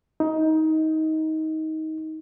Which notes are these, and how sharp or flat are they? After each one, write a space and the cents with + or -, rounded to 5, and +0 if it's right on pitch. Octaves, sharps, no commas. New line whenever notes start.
D#4 +20